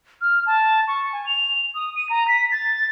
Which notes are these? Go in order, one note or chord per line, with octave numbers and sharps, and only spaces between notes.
F6
A5
C#6
G#5
F7
D#6
D#7
A#5
B6
A6